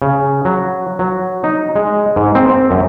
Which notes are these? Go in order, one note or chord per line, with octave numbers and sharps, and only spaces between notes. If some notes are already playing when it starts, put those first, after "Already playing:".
C#3
F#3
F#3
D#4
G#3
G#2
C4
C4
F#2